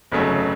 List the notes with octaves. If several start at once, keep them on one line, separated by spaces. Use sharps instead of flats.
G1 F2 C#3 F#3 A3